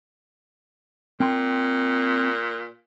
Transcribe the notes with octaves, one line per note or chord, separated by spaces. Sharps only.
A#2 C4 G5 C6